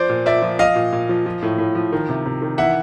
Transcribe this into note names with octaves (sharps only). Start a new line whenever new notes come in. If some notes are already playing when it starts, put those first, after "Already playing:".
Already playing: F3 C5 D5
A#2
A#2 D5 E5
F3
F3 D#5 F5
A#2
A#2
F3
F3
A2
A2
F3
D#3
C3
C3
D#3
E3 E5 F#5